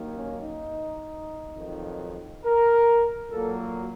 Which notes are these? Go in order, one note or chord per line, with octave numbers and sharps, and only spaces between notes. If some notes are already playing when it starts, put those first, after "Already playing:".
Already playing: D#2 D#3 F#3 A#3
C#4
D#4
F2 D#3 F#3
A#4
A#2 F#3 A#3 A4
F#4